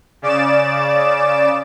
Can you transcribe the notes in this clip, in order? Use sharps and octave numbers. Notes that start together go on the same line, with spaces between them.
C#3 D5 D6 E7